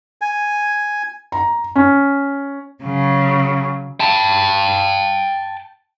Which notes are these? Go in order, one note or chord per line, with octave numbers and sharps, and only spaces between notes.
G#5
A#5
C#4
C#3 F#3
G5 A5